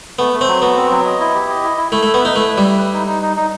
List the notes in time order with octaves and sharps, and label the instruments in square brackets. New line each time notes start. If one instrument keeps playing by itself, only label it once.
[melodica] A3 [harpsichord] B3
[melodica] A3
[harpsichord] C4
[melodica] F#3
[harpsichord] B3 [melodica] F#4
[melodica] C4
F#3
D#5
E4
G4
D#5
E4
E4
[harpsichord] A3 [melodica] E4
[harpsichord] A3
[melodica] E5
[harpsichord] B3
[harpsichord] D#4 [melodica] B4
[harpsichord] A3 [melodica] E4
[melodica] B4
[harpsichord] G3
[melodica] E5
B4
D#4
D#4
D#4
D#4